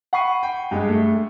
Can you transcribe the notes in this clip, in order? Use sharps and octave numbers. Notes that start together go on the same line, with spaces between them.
F#5 B5 C#6 C7 D#7
G5
G2 G#3
A3